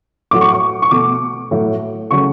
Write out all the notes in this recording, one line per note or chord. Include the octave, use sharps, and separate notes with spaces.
A2 F#3 A3 D6
C#6
C#6
C#6
B2 A3 D6
A2 F#3 A3
C#3 F#3 A3 C#6